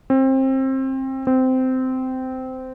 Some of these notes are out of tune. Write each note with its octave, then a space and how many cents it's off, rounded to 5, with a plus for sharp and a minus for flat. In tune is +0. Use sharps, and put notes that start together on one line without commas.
C4 +25
C4 -15